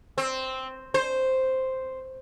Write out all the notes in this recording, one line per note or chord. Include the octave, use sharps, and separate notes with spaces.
C4
C5